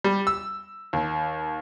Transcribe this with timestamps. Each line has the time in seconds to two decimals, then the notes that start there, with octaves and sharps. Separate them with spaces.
0.04 G3
0.27 E6
0.93 D#2